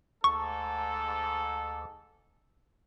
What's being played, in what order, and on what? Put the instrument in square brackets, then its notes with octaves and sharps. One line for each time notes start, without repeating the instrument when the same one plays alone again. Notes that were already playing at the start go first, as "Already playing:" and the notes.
[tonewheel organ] D2 [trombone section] G#2 A4 [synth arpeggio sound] C#6